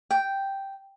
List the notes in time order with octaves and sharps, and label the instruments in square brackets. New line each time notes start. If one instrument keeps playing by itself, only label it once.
[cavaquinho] G5